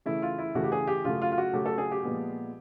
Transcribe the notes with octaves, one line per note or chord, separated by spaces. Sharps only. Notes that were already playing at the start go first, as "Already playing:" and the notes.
C#3 E3 A3 E4
F4
E4
C#3 E3 A3 F#4
G4
G#4
G4
C#3 F#3 A3 F4
F4
F4
F#4
C#3 F#3 A3 G4
A4
G#4
G4
A#2 F3 G#3 B3